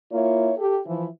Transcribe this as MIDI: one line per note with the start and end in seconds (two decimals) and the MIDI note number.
0.12 0.52 58
0.12 0.52 64
0.12 0.52 65
0.12 0.52 73
0.57 0.78 67
0.57 0.78 69
0.86 1.06 52
0.86 1.06 53
0.86 1.06 64